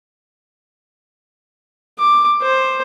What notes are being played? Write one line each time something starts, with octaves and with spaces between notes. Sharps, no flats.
D6
C5